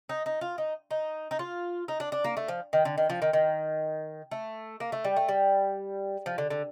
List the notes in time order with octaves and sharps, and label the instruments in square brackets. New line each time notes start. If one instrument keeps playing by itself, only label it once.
[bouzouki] D#4
D#4
F4
D#4
D#4
D#4
F4
D#4
D4
D4
A#3
A3
F3
D#3
D3
D#3
F3
D#3
D#3
A3
A#3
A3
G3
A3
G3
F3
D3
D3